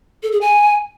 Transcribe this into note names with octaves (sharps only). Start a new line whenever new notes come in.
A4
G#4
G#5